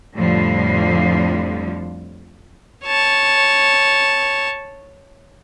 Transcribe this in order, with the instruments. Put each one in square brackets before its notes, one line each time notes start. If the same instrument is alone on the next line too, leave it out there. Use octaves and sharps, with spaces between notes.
[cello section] F2 A2 D3 F3 G3
[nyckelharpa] C#5 A5